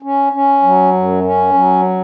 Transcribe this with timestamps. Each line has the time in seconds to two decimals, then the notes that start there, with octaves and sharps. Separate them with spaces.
0.02 C#4
0.33 C#4
0.63 F#3
0.93 F#2
1.24 C#4
1.54 F#3